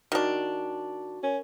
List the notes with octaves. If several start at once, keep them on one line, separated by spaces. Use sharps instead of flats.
D#3 D4 F#4 F#5 C#6
C#4 A#4